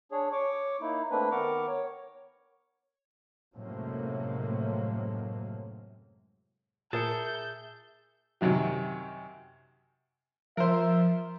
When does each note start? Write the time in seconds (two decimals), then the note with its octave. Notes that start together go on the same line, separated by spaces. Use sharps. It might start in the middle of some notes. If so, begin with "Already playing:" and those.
0.12 D4 G#4 C#5
0.33 C#5 C#6 D6
0.81 A#3 D#4 E4
1.11 A3 A#3 C4 D4 B4
1.31 D#3 B3 A#4 A#5 C#6 D6
1.68 C#5
3.57 F#2 A2 C3 F#3 G#3 A#3
6.93 A#2 G#4 A#4 E5 A5 G6 C#7
8.41 F#2 C3 D#3 F#3
10.57 F3 A#4 C5 E5